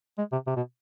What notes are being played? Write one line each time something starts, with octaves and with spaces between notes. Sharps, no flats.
G#3
C3
C3
B2